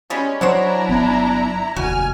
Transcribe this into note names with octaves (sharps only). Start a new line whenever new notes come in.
G3 G#3 C#4
F#3 D4 E4 C5 C#5 F#5 A#5
G1 F#3 B3
F1 D#2 F#4 G#5 F6